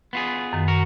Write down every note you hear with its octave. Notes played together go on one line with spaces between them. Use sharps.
B3 F4 G#4
F#2 D#3
F#4 A#4